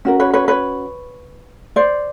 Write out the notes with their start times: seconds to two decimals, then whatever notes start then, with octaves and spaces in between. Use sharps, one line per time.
0.05 C#4 F#4 A#4
0.20 B4 C#5
0.34 B4 C#5
0.48 B4 C#5
1.76 C5 D5